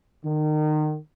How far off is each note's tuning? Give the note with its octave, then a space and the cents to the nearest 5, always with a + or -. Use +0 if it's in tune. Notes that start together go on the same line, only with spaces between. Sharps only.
D#3 -30